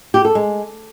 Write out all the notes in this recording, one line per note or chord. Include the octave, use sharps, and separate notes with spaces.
G4
A4
G#3